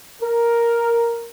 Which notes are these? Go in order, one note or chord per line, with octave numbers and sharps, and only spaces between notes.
A#4